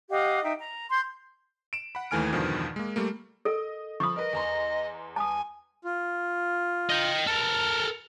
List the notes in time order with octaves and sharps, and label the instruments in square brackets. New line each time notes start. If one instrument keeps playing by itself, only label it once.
[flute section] G4 D#5 F5 F#5
D#4 E5 G5
A#5
C6 G6
[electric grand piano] D7 E7
F#5 B5
D#2 E3 A3 G#5 F6 D7
E2 G2 B2 D3 D#3 F3
G#3 A#3
G3 A3 A#3
[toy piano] A4 A#4 [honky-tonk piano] D#5
[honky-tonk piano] F3 B5 [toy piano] C#6 D#6
[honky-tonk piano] A#4 B4 [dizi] D#5
[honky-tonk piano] E2 A#5 C6
[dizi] G#5 [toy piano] A5 D#6
[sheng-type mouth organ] F4
[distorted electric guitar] D#5 G5
[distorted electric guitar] A4 A#4 [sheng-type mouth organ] F6